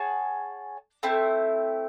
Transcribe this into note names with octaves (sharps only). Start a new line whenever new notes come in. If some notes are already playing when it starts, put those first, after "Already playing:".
Already playing: G#4 C#5 F#5 A5
A3 C4 E4